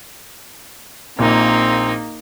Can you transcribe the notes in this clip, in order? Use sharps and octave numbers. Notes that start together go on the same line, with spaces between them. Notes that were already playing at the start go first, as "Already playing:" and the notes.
A#1 A#2 A#3 C4 D#4